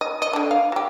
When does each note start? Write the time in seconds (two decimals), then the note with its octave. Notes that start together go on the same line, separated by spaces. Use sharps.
0.01 D#5
0.22 D#5
0.33 D3 D4
0.51 F5
0.72 F#3 G4